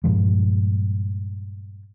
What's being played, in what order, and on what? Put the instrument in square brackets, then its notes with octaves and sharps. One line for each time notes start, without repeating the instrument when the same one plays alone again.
[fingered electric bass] G2 A#2 F3 G#3